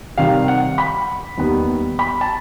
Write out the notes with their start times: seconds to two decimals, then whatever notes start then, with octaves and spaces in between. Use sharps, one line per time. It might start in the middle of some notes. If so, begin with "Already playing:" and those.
0.18 C3 D#3 G3 F5
0.48 F#5
0.78 B5
1.38 D#2 D#3 G3 B3
1.99 B5
2.21 A5